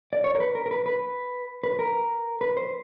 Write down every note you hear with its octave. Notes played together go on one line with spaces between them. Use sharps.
D5
C#5
A#4
B4
A#4
A#4
B4
B4
B4
A#4
B4
C5